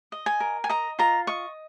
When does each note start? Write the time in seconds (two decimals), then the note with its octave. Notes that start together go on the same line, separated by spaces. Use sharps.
0.12 D#5
0.26 G#5
0.40 A#4
0.64 G#5
0.69 D#5 A#5
0.99 F4 A#5
1.27 D#5 C#6